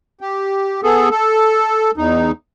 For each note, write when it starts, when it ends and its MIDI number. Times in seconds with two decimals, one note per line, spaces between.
0.21 0.81 67
0.83 1.09 59
0.83 1.09 68
0.83 1.09 69
1.11 1.91 69
1.97 2.31 40
1.97 2.31 63